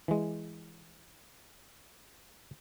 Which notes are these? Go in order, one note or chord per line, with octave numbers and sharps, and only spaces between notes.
E3 G#3